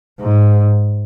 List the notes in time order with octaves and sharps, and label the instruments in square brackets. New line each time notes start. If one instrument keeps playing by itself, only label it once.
[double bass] G#2